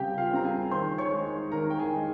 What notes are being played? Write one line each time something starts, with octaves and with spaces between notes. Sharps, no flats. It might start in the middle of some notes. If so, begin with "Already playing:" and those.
Already playing: C#3 G3 C4 G4 G5
F4 F5
G3 C4 A#5
G#4 G#5
D#3 C5 C6
C#5 C#6
G#3 D#4
D#3 A#4 A#5
G5
G#4 G#5
G#3 D#4